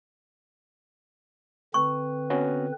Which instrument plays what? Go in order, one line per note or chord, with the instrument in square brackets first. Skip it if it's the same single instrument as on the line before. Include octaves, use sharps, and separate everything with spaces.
[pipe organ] D3 C4 B4 [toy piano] C#6
[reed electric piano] B3 C#4 F#4